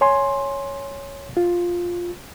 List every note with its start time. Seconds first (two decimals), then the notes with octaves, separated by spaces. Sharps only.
0.01 C#5 G#5 C6
1.37 F4